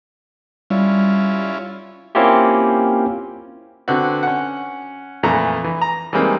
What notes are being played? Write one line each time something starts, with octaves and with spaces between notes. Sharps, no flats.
G3 C#4 E4 F4
A#3 C4 C#4 E4 F4 G4
D3 B3 C4 F#4
C#4 F#5
F2 A#2 E3 A3 A#5
E3
A#5
E3 G3 G#3 A#3 C4 D#4